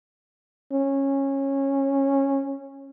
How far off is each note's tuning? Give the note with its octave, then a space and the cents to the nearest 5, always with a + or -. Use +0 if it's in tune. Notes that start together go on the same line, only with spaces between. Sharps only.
C#4 -15